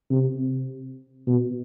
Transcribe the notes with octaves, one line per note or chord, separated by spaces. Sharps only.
C3
B2